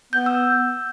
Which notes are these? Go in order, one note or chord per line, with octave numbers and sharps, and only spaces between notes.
B3 G6
E6